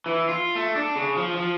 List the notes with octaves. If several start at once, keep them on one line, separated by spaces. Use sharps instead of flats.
E3
F4
A3
D4
C#3
F3
F3